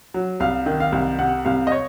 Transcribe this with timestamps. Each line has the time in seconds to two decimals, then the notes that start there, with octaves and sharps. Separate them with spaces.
0.14 F#3
0.40 C2 F5
0.66 D#3
0.80 F5
0.92 C2
1.19 C3 F#5
1.45 C2 F5
1.67 D#5
1.72 C#5